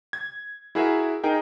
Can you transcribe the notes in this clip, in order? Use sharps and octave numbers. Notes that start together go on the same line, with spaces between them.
G#6
E4 F#4 G#4 A#4 E5
D#4 G#4 A#4 G5